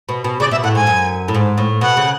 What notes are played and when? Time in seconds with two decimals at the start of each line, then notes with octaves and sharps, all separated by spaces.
0.09 B2
0.24 B2
0.40 C#3 D5
0.51 B2 E5
0.64 A2 F#5
0.75 G#2 G#5
0.87 F#2
1.28 A2
1.34 G#2
1.58 A2
1.81 B2 F#5
1.97 C#3